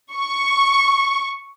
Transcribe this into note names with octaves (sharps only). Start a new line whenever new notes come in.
C#6